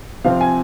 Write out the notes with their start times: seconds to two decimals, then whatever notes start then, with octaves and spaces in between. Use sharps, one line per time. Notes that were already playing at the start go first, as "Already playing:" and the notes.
0.24 C3 F3 C4 F5
0.41 G#5